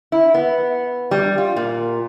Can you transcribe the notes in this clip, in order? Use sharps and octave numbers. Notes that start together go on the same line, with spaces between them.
E4
B3
G3
F4
A#2